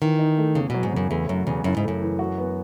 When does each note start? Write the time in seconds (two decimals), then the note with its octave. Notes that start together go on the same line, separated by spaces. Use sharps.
0.02 D#3 E3
0.19 D#4
0.38 A3
0.55 E2 C#3
0.70 B2 F#3
0.83 G#2
0.92 F#2 C#3
1.10 E2 A3
1.29 F#2 F#3
1.46 E2 C#3
1.64 F#2 E4
1.77 G#2
1.83 F#2 A3
2.01 E3
2.19 F#4
2.38 B3